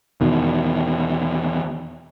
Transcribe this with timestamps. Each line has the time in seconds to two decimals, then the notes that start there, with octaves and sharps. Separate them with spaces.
0.21 E2 B2 D#3